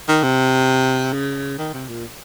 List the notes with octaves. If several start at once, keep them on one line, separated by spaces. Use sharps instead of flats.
D#3
C3
C#3
D#3
C3
A#2